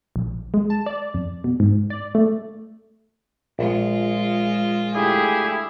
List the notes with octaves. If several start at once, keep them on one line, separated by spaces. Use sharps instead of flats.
A#1
G#3
A5
D5
F2
B2
G#2
D5
A3
A#1 G#3 F4
D3 A3 E4 G4 G#4